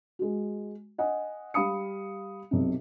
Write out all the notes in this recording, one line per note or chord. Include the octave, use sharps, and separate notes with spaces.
G#3 F#4
D#5 F#5 G#5
G3 F5 B5 D#6 C#7
B1 C3